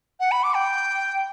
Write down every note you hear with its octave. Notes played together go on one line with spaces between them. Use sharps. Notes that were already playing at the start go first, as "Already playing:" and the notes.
F#5
B5
D6
G5